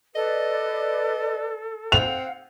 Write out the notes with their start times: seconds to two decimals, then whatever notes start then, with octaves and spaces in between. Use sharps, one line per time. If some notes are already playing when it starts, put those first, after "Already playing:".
0.15 A4 B4 D5 D#5
1.92 C4 F5 F#5 F7